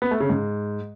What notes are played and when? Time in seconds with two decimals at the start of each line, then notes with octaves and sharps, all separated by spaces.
0.02 B3
0.11 A3
0.20 C#3
0.30 G#2